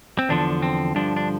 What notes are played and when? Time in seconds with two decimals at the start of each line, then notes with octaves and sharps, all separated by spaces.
0.19 C4
0.29 E2 D3 F3 D4
0.62 C4
0.95 G2 D3 F3 D4
1.17 D4